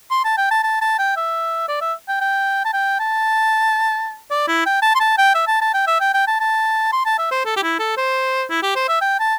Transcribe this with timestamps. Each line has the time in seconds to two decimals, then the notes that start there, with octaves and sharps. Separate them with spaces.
0.11 C6
0.25 A5
0.38 G5
0.51 A5
0.63 A5
0.81 A5
0.99 G5
1.17 E5
1.68 D5
1.81 E5
2.08 G5
2.21 G5
2.65 A5
2.73 G5
2.99 A5
4.31 D5
4.48 E4
4.66 G5
4.82 A5
4.95 C6
5.00 A5
5.18 G5
5.35 E5
5.48 A5
5.61 A5
5.74 G5
5.87 E5
6.00 G5
6.14 G5
6.27 A5
6.40 A5
6.93 C6
7.05 A5
7.18 E5
7.31 C5
7.45 A4
7.56 G4
7.63 E4
7.79 A4
7.97 C5
8.50 E4
8.62 G4
8.76 C5
8.88 E5
9.01 G5
9.20 A5